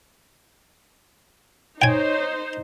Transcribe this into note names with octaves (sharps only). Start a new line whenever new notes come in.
D#4 C5 C#5 G5 G#5